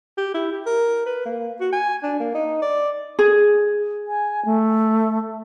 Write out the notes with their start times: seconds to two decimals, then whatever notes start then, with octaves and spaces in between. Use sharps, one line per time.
0.18 G4
0.34 E4
0.52 G4
0.66 A#4
1.06 B4
1.25 A#3
1.61 F#4
1.72 G#5
2.03 D4
2.20 A#3
2.35 D#4
2.62 D5
3.19 G#4
4.08 G#5
4.45 A3